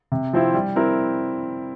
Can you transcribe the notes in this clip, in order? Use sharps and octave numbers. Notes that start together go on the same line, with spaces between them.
C3
F3 C4 E4
G3
C4 E4 A#4